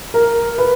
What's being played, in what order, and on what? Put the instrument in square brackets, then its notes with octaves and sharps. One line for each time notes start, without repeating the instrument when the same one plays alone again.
[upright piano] A#4
B4